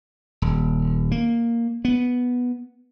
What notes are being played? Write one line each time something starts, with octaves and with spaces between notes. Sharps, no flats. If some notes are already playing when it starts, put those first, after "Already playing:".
D#1
A#3
B3